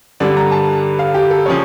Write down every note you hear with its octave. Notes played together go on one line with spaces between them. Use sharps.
G2 D3 G3 D5
A#5
A5
F5
G4
A4
C#3 F3 C#5